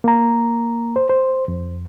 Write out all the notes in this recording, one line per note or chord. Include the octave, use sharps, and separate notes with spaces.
A#3 A#5
C5
C5
F2